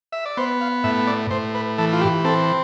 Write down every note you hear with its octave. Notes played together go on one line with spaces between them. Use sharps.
E5
D5
B3 C5
F5
A2 E5
D5
A2 C5
B4
E3 A4
F4
G4
C4 A4